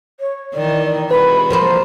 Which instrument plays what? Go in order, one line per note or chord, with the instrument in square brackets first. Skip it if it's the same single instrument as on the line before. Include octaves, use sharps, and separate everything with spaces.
[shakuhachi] C#5
[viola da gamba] D#3 E3 [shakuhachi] D5
[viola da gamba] C3 G#3 F#4 [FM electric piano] B4 [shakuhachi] B5
[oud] F3 A#3 C5